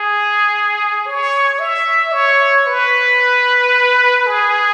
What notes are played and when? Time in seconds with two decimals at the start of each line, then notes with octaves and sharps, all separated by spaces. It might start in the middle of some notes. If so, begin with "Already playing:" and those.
Already playing: G#4
1.06 C#5
1.59 E5
2.12 C#5
2.67 B4
4.27 G#4